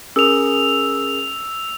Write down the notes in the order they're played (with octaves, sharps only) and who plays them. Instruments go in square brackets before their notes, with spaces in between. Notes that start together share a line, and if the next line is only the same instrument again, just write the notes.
[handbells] C#4 G#4 A#4 [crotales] E6 F7